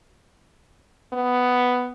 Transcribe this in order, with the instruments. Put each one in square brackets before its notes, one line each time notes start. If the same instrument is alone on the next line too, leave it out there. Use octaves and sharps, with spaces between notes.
[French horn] B3